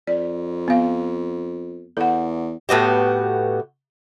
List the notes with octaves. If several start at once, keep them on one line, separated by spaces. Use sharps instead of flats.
F2 D5
B3 F5
E2 A4 F#5
A2 B3 F#4 G4